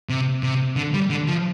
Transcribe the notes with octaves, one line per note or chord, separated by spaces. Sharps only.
C3
C3
D3
G3
D3
F3